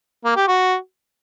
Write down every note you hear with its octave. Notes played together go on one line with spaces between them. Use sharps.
A#3
G4
F#4